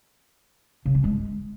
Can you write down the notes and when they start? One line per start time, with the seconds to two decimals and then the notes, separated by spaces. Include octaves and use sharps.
0.85 C#3
0.95 C#4
1.04 G#3